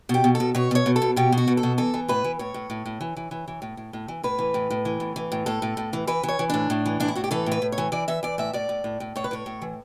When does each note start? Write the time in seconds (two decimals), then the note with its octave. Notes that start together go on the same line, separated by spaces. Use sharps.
0.09 B2 G4
0.24 B2
0.35 A4
0.40 B2
0.55 B2 C#5
0.71 B2 C#5
0.86 B2
0.96 A4
1.02 B2
1.16 B2 G4
1.32 B2
1.38 F#4
1.47 B2
1.57 A4
1.63 B2
1.78 E3 A4
1.94 E3
2.08 A2 B4
2.24 E3
2.39 A2 C#5
2.54 A2
2.70 A2
2.86 A2
3.01 E3
3.17 E3
3.31 E3
3.48 E3
3.62 A2
3.77 A2
3.93 A2
4.08 E3
4.23 A2 B4
4.39 E3
4.54 A2
4.70 A2
4.85 E3
5.00 A2
5.16 E3
5.32 A2
5.46 A2 A4
5.62 A2
5.77 A2
5.93 E3
6.07 E3 B4
6.23 E3
6.28 C#5
6.39 E3
6.50 A2 D4
6.70 A2
6.86 E3
7.00 A2 D4
7.08 E4
7.15 A2 F#4
7.24 G4
7.31 E3 A4
7.46 A2
7.52 B4
7.62 A2
7.72 C#5
7.78 E3
7.92 E3 D5
8.08 E3 E5
8.23 E3 D5
8.38 A2 E5
8.53 A2 D5
8.69 A2
8.84 A2
9.00 A2
9.16 A2 C#5
9.24 B4
9.31 A2 C#5
9.46 A2
9.62 E3